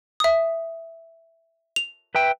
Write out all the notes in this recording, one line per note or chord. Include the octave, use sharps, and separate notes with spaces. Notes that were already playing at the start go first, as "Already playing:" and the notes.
E5 D#6
F7
B4 E5 G5